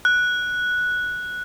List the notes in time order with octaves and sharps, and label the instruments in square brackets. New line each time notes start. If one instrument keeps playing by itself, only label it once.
[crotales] F#6